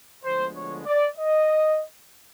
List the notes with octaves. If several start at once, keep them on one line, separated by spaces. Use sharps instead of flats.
D2 D3 F3 G#3 B3 C5
C#5
D5
D#5